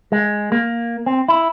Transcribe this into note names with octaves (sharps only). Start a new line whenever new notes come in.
G#3
A#3
C4
E4